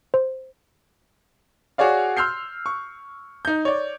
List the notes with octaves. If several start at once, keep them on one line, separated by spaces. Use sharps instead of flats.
C5
F#4 G#4 C#5 D5 F5
C6 E6 F6 G6 C7
C#6
D#4 G6
C#5 D5